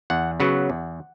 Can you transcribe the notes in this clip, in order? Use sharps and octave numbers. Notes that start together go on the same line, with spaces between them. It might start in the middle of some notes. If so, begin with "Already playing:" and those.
E2 F#5
C#3 F#3 B3 F#5
E2